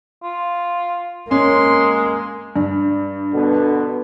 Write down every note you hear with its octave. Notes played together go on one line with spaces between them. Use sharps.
F4
G#3 A#3 C#4 C6
G2
B2 D3 B3